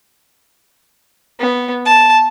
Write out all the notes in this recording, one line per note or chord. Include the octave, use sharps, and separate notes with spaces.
B3
A5